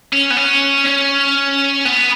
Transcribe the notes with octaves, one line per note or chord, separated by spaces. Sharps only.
C#4
B3
C#4
C#4
B3